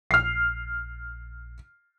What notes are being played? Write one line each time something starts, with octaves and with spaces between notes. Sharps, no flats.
A#1 F6 C7